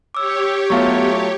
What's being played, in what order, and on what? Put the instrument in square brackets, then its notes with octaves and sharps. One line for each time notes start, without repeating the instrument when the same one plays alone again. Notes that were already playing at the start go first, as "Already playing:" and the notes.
[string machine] G4 C#5 [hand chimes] D6 E6
[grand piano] F#3 A3 F4 [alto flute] B3 [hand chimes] E5 C#6